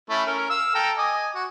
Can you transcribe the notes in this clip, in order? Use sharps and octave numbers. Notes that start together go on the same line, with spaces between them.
A3 C#4 E4
C#4 A#4
F5 E6
A4 G5 A#5
D#5 G#5 D6
F#4